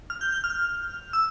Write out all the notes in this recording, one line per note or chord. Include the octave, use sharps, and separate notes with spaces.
F6
G6
G6
F6
E6